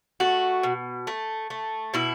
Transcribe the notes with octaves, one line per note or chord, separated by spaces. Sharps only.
A3 F#4
B2
A3
A3
B2 E4